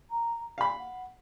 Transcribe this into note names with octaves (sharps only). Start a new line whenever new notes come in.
A#5
F#4 F5 B5
F#5